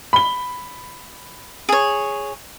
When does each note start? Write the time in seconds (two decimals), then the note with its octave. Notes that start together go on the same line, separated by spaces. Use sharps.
0.13 B5 G7
1.69 G#4 C#5